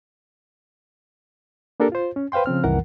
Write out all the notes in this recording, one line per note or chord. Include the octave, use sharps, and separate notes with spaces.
A#3 D4 G4 A4 A#4
F4 C5
C#4
B4 C5 F5 G5 C6
C#3 F3 C4 F6
C2 F#2 D#3 E3 A#4 F#5